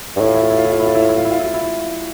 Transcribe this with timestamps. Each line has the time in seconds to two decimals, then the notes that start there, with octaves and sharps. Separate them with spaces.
0.16 G2
0.21 A2 E4
0.28 F4
0.35 E4
0.43 F4
0.50 E4
0.58 F4
0.65 E4
0.72 F4
0.80 E4
0.87 F4
0.95 E4
1.01 F4
1.09 E4
1.17 F4
1.25 E4
1.32 F4
1.39 E4
1.46 F4
1.54 E4